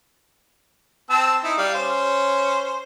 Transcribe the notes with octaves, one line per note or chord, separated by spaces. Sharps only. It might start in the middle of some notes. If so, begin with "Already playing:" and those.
C4 A5 E6
D#4 E4
G3 F5
C#4 C5